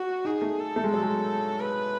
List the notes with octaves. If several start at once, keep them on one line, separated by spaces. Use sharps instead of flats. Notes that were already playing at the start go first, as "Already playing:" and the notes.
Already playing: F#4
D#4 G#4
A3
A4
A3
G#3
F#3 A4
G#3
B4